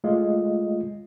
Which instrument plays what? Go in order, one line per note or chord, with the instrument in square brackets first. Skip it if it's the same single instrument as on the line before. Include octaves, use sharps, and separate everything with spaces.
[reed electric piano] G#3 A3 F4 D#5